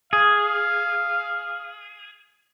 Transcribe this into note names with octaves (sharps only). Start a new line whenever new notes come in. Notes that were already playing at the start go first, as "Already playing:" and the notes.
G#4 F5